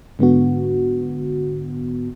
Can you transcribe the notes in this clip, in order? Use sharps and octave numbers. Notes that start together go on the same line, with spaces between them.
G#2 D3 B3 F#4